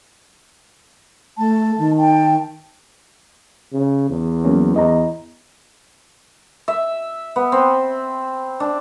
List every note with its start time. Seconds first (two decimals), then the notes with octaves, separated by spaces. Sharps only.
1.38 A3 A5
1.78 D#3
1.97 G5 A5
3.73 C#3
4.09 E2
4.45 F#3 A#3 C#4
4.76 E2 D#5 A#5
6.68 E5
7.36 B3
7.52 C4
8.60 D4